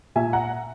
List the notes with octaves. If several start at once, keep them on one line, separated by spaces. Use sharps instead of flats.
A#2 E5 G#5
F#5 A#5